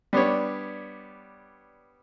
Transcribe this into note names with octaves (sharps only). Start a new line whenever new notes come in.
G3 B3 D4 C#5